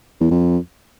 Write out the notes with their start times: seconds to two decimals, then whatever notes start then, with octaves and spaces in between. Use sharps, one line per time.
0.21 E2
0.31 F2